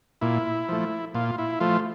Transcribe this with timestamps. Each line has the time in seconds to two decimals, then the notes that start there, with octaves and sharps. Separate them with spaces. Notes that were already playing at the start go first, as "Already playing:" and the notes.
0.21 A#2 E4
0.69 F3 A3
1.15 A#2 F4
1.38 E4
1.60 F3 A3 F4